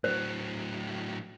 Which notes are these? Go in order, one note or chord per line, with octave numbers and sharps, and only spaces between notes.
A2 F#3 C5